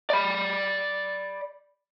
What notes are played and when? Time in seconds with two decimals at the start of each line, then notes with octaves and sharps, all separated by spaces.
0.10 D5 B5